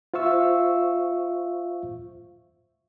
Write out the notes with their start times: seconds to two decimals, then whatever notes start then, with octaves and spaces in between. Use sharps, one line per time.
0.14 F4 C5 E5 F5 C#6 E6